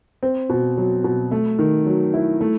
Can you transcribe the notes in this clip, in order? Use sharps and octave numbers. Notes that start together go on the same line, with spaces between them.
C4
B2
F#3
B2
A3
D#3
F#3
E4
A3